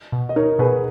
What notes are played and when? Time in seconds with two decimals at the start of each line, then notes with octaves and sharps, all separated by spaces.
0.12 B2
0.29 D#5
0.36 D#4 A#4 C#5
0.59 B2 G#4 B4